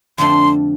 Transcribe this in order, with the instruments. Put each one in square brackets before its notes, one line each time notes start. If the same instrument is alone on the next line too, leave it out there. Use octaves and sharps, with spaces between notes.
[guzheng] F2 D3 F3 A3 D4 [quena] C6